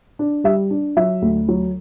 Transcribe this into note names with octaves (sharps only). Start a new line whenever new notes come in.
D4
G3 E5
D4
F#3 E5
D2
F#3